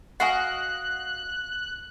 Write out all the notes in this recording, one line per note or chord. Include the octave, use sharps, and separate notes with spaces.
F#4 D#5 F5 F#5 G#5 F#6